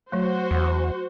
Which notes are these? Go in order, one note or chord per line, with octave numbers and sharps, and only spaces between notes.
F#3 A3 F#4 C5
E2